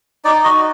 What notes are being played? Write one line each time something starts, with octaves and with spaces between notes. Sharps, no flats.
D#4 D5
F#4 D#5